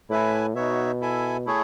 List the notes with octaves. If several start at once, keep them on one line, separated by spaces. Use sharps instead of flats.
A2 E4 B4 E5 G#5
B2 D#4 F#4 C#5 E5
E4 A4 E5 G#5
A3 E4 G#4 C#5